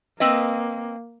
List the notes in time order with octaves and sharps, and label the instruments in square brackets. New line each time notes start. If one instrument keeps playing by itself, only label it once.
[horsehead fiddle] A#3 [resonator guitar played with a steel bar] C4 B4 D#5